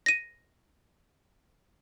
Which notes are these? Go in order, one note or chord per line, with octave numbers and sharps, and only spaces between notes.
A#6 D#7